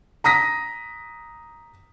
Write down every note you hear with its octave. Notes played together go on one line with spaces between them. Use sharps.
A#5 D#6 A#6 B6